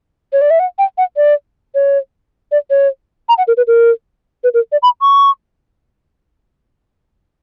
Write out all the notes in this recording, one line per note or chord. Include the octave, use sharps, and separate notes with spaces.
C#5
D5
E5
F#5
G5
F#5
D5
C#5
D5
C#5
A#5
F#5
A#4
B4
A#4
B4
A#4
D5
B5
C#6